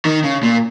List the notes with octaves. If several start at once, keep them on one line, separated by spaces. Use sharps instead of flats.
D#3
C#3
A#2